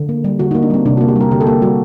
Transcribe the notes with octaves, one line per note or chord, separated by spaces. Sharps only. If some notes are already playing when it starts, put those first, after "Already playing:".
Already playing: D3
A#3
G3
D3 F#4
A#3 D#4
D4
G3 C4
C3 D4
A#3 F#4
G4
G3 A#4
D3 G4
A4
A#3 G4
G3 F#4